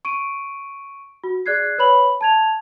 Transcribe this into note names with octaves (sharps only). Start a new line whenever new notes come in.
C#6 D7 D#7
F#4
G#4 D5 F#6 G#6 C7
B4 C#5 B5 F#7
A5 G#6 F7